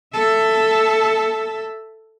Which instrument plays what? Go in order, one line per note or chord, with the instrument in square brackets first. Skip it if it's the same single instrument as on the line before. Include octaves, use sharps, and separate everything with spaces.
[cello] A4 E5